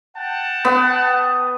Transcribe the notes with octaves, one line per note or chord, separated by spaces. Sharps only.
F#5 G5 A5
B3